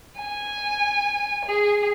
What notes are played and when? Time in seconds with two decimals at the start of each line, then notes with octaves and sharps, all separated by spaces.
0.18 G#5
1.45 G#4